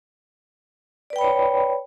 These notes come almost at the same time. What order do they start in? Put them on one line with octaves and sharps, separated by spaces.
D5 B4 G5 B5 C#5